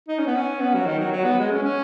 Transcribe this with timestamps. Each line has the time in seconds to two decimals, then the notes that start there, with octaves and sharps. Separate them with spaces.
0.08 D#4
0.18 C#4
0.26 B3
0.35 C#4
0.60 B3
0.74 F#3
0.86 D#3
0.99 F#3
1.12 F#3
1.24 B3
1.38 G#3
1.51 C#4
1.63 C#4